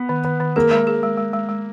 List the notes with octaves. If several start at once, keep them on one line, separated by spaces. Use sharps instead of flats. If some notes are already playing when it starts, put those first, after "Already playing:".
Already playing: B3
D#3
D#3
D#3
A#3 G#4
G#3
G#4
G#3
G#3
G#3
G#3